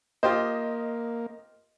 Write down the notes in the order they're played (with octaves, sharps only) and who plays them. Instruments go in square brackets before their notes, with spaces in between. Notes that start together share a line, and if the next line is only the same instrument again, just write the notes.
[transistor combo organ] A#3 [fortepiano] F4 G4 C5 [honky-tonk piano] D#5